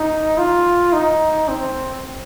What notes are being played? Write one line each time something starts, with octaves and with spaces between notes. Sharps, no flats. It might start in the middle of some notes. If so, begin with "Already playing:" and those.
Already playing: D#4
F4
D#4
C4